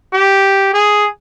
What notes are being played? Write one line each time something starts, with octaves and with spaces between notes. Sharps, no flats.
G4
G#4